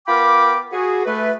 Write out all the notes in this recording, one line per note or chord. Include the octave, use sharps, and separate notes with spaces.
B3 F4 A#4 G5 B5 D6
F#4 G#4
A3 B4